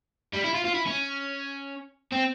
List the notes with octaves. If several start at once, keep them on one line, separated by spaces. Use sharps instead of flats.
G3
E4
F4
F4
E4
C#4
C4